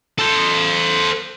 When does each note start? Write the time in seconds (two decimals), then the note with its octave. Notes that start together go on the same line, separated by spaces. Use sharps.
0.18 A4 C5